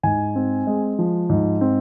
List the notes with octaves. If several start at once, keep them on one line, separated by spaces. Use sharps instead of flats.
G#2 G#5
C4
G#3
F3
G#2
C4